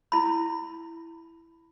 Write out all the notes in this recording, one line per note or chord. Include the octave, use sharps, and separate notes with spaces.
E4 B5